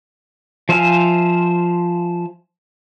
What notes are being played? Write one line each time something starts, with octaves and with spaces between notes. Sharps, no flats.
F3 C5 E5 F5 G#5